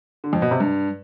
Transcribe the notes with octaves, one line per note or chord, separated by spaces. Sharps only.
D3
F2
B2
C3
G2